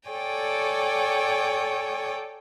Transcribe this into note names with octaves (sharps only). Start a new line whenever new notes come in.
A4 C#5 D5 G5 G#5